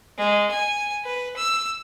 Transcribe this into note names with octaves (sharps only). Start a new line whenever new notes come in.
G#3
G#5
B4
E6